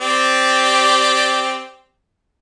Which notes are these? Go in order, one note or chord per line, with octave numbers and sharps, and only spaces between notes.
C4 G4 D5